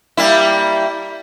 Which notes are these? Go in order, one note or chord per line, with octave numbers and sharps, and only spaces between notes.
G3 A#3 E4